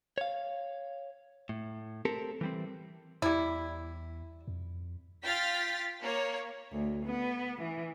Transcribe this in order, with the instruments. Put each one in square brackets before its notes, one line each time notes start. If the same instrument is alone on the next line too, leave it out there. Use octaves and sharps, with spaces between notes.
[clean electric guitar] C#5 F5
A2
C4 G4 A4 A#4
E3 G3 C4
[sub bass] E2 [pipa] G3 E4
[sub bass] F2
[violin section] F4 G5 F6 A6 B6
A#3 C#5
[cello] D2
B3
E3